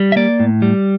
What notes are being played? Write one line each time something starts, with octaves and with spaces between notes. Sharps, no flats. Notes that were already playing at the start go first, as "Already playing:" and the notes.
Already playing: G3
E5
A#3 D5
A2
G3